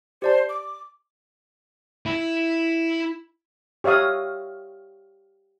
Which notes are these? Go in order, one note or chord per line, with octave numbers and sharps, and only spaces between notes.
G4 C5 D5 A5
D6
E4
G4 C#5 E5 F5 D#6